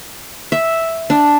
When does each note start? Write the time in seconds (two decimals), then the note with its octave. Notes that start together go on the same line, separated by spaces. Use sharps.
0.52 E5
1.10 D4